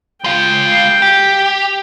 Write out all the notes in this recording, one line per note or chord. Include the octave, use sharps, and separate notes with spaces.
G#3 F5 G5
G4